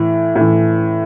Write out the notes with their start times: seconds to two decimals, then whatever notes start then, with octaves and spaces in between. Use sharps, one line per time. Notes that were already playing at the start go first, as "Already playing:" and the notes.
Already playing: A2 E3
0.35 A2
0.40 E3